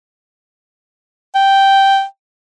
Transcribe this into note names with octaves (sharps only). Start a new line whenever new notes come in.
G5